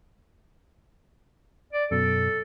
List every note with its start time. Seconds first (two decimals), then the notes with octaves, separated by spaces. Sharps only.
1.73 D5
1.91 F#2 B2 A4